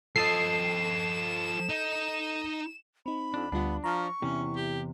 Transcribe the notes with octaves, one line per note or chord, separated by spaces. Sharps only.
F3 A4 D#5 A5 C7 E7
D#4
C4 D#4 B5
F2 D4
D2 G3 B3 D4 F4
F3 A#5 C#6 F6
E2 C3 C#4 E4
G4